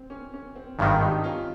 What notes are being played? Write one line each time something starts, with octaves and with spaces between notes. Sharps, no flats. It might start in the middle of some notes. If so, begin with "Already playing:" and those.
Already playing: C4
C#4
C#4
C4
G#1 G2 D#3 C4 D#4
D#4 G4
C#4 F4